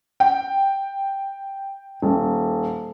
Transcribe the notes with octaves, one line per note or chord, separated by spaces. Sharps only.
G5
D#1